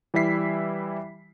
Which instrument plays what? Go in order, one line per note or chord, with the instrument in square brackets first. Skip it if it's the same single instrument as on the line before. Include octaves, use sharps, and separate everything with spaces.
[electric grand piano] E3 G3 E4 E5 B6 C7